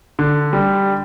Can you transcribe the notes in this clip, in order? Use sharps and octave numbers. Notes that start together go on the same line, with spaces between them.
D3
G3